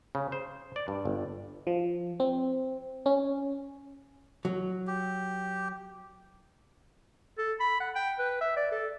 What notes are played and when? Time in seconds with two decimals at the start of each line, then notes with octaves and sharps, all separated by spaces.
0.15 C#3
0.32 C5
0.76 D5
0.88 G2
1.05 G1
1.67 F3
2.20 C4
3.06 C#4
4.45 F#3
4.87 G4
7.38 A4
7.60 B5
7.80 F#5
7.95 G5
8.19 B4
8.41 E5
8.56 D5
8.72 A4